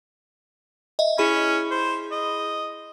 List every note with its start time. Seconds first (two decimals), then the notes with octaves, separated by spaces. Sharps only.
0.99 D#5 E5
1.18 C#4 E4 G#4 B5
1.71 C5
2.12 D#5